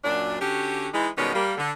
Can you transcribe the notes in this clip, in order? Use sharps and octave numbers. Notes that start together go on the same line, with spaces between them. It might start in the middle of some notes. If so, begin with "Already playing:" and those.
F#2 A#2 F#3 D4
D3 C#4 F#4 G4
E3 G#3 D#4
B2 D#3 G3 G#3 B3 C#4
G3 A#3
D3